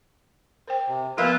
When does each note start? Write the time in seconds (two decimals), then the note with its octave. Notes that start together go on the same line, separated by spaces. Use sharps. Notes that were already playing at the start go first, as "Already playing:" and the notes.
0.68 A#4 C5 G5
0.88 C3
1.18 F3 A#3 B3 F4 B4 E5